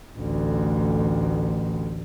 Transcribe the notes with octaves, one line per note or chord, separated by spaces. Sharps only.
A1 D2